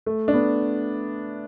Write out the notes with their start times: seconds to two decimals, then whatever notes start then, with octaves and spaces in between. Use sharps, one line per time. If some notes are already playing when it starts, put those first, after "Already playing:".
0.06 A3
0.28 D4
0.34 B3